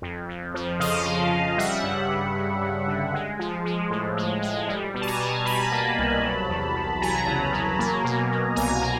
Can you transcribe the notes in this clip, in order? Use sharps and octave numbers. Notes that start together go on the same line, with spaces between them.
F2
F2
F3
C#3 D#5 F5
C#3
C#3
G3 E5 F#5
G2
G2
G2
G2
D3
G#3
F3
G#3
A2
G#3
G#3
G3
B2
A5
G#5 A#5
B2
G3 A5 B5
A#3
C2
F#3
E2
E2
F#3 G#5 A#5
C#3
F#3
A#3
B2
F#3
C2 G#5 A#5
A#3